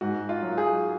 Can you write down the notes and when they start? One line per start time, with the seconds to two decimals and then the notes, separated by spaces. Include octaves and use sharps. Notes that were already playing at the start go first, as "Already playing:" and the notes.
0.01 G#2 F#4
0.29 F4
0.43 F#3
0.58 G#4